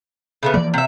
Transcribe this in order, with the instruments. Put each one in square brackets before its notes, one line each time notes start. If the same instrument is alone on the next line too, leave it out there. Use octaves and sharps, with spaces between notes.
[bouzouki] C#3 A3 B3
[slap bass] E3 F3 A#3 [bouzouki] D5
[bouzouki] C3 E5